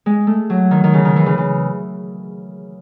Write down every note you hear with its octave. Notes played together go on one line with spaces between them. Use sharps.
G#3
A3
F#3
D#3
D#3
C#3
D#3
E3
C#3
C#3